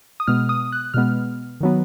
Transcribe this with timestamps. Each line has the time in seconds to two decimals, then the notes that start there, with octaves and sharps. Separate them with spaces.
0.20 D#6
0.27 B2 G#3 B3 F6
0.49 D#6
0.72 F#6
0.94 B2 G#3 B3 F6
1.61 D#3 F#3 B3